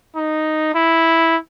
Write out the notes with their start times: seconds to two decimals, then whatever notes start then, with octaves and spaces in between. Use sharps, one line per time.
0.16 D#4
0.75 E4